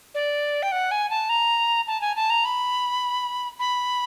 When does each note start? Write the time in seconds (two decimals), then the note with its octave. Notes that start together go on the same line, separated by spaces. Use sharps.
0.15 D5
0.62 G5
0.72 F#5
0.91 G#5
1.10 A5
1.29 A#5
1.87 A5
2.01 G#5
2.16 A5
2.30 A#5
2.45 B5
3.59 B5